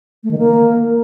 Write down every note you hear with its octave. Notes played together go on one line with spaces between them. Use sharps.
A3
D#3
A#3